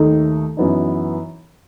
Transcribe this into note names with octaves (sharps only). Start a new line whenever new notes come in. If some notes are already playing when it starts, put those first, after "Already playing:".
Already playing: D#2 D#3 A3 D#4 A4
F#2 E3 B3 D#4